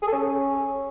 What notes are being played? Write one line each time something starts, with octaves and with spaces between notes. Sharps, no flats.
G#4
A4
C#4